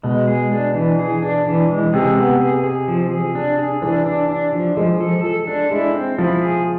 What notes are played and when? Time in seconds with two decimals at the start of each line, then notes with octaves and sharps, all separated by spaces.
0.03 B2 G#3
0.28 G#4
0.52 D4
0.74 E3
0.99 G#4
1.22 D4
1.46 E3
1.69 G#3
1.92 C3 G#4
2.17 B3
2.40 G#4
2.64 G#4
2.88 F3
3.11 G#4
3.35 D4
3.59 G#4
3.82 E3 D4
4.06 D4
4.29 D4
4.53 F3
4.77 F3 G#3
5.01 A4
5.24 A4
5.47 D4
5.71 G#3 E4
5.94 C4
6.18 F3 E4
6.41 G#4